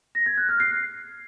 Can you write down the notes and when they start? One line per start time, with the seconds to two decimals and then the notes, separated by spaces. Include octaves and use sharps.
0.15 A#6
0.26 G#6
0.37 F#6
0.49 F6
0.60 C7